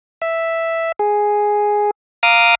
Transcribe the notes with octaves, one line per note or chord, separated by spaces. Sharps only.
E5
G#4
F5 A#5 D6 D#6